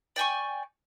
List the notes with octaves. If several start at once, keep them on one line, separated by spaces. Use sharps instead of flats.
D5 G5 G#5 C#6